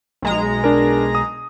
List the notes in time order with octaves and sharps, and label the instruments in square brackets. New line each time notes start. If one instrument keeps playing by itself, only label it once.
[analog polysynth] B1 G#3 A#5
[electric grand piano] D4 A#4
D#6